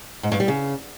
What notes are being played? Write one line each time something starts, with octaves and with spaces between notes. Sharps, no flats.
G#2
G2
G3
C#3